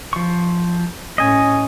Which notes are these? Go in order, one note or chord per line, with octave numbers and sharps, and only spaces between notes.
F3 C#6
A2 C#4 D#5 G#5